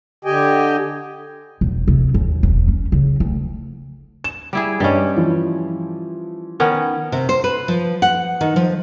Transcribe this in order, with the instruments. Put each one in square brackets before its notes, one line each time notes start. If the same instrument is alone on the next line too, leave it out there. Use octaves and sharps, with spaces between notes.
[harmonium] D3 G4 D#5 G5 G#5
[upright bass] E1
C3
D#2
E1
C#4
C#3
D2
[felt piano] E7
[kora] G3 E4 G#4
[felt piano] G2 D#5 [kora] G3 C#4
[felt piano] E3 F3
[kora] D#3 B3 C#4
[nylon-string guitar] C3
C5
B4
F3
F#5
D#3
F3